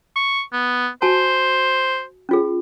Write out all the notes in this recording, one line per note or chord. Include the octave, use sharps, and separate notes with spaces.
C#6
B3
F#4 C5 G#5 A5
C#4 F4 G#4